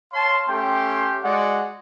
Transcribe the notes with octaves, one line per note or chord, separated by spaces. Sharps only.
C#5 F5 A5 C6
A3 C#4 G4 G5 C6
G#3 F#4 D5 F#5